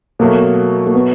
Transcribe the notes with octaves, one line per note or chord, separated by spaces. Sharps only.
B2 F#3 A3 A#3
A#3
B3